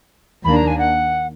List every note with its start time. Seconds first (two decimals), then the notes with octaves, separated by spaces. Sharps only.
0.44 D#2 D#3 A#3 D4 B5
0.56 A#5
0.67 G#5
0.79 F#5